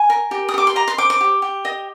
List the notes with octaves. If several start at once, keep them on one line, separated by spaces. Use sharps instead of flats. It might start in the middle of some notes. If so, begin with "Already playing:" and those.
Already playing: G#5
A#4
G4
D#6
G4 D6
C6
D#5 A#5
C6
C5 D6
D6
G4
G4
D#5